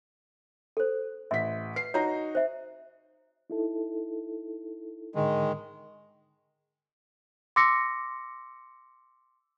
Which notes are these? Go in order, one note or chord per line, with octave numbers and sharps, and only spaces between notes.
A4 C5
A1 E5 B6
B4 C7
D#4 F#4 C#5 A#5
C5 E5
D#4 E4 A4
G#2 D3 D#3 G#3
C6 D6 E6 A#6 C#7